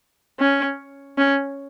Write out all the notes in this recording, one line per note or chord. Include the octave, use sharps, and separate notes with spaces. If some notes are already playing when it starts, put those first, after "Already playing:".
C#4
C#4